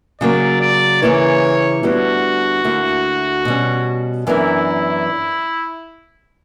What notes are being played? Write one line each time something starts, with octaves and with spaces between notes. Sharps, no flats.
C#3 F#3 A#3 D5
D5
C#3 E3 A#3 E4 B4 C#5
D2 D3 G3 B3 E4 F#4
D2 D3 A#3 E4
B2 G3 C#4
F#2 E3 B3 D4 E4 A#4